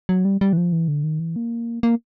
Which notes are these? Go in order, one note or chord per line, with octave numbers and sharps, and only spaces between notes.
F#3
G3
G3
E3
F3
E3
D3
D#3
E3
A#3
A#3